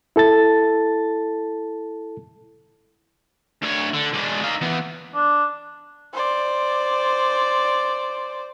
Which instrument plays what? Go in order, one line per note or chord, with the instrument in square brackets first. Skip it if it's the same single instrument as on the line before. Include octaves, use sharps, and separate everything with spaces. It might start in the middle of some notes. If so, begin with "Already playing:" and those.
[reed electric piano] E4 A4 A5 A6
[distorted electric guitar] D2 C#5
D3
G#3 D4
D#4 F5
E3 B3
[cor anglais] D4
[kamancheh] C5 D5